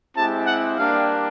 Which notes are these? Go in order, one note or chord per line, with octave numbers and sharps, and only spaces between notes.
G#3 C4 E4 G4 A5
F#5
G3 A#3 D4 G4 F5